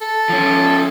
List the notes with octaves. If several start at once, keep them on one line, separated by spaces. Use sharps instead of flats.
A4
F3 C#4